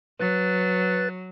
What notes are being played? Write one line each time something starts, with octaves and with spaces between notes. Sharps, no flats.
F#3 B4 F#6 A6